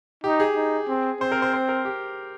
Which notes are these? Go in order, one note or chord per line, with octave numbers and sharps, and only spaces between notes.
D#4 G4
G#4
D#4
C4
C4 C5
A#4
C5
C5
A#4
G4